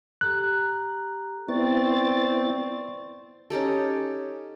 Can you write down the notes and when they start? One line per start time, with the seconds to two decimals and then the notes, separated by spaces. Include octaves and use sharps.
0.21 G4 A4 A#5 F#6
1.48 B3 C4 E4 D5 C#6 A6
3.50 C#4 D#4 G4 A4